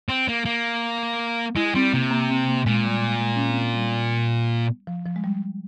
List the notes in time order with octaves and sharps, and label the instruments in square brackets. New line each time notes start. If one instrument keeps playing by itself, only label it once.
[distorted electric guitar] C4
A#3
A#3
[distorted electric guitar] G#3 [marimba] E4
[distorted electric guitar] G3 [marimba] C4
[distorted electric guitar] C3 [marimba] A#3
[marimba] A#3
C4
A#3
[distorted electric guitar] A#2 [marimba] G#3
[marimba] G3
G#3
G#3
C#4
C4
G3
F3
F3
G#3
G3